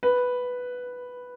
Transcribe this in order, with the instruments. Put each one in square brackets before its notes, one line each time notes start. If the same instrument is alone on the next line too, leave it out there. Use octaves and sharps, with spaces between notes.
[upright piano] B4